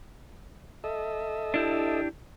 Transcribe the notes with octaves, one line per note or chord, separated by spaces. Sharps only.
A4 D#5 E5
D4 E4 G4